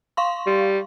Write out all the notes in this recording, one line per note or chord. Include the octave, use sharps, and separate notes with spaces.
F5 C6 C#6
G3